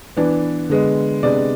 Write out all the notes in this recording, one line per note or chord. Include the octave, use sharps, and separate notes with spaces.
E3 B3 D4
D3 G#3 B3
C3 G#3 B3 D4 D5